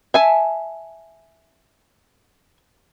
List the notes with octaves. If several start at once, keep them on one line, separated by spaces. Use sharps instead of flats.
E5 G#5 A5